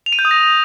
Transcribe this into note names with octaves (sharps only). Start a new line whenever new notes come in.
F7
D#7
G6
D#6
A#6